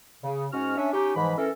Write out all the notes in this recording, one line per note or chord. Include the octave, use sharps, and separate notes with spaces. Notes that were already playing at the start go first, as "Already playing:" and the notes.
C#3
G#2 C#4 F#4 F6
C#4 D4 E5
C#4 D#4 G4
G#2 E3 F3 B5
E3 C#4 A4 A#4